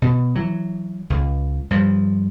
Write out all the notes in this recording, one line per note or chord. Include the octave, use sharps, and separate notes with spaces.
B2
E3 F#3
C#2
G2 F3